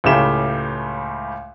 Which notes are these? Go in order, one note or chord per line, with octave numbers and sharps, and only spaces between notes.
C#2 A2 C#3 A3 G4 E7